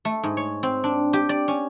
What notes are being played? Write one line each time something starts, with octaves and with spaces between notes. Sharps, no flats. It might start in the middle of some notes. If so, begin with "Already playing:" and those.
A3
G#2
C#5
C4
D4
G4
D5
C#4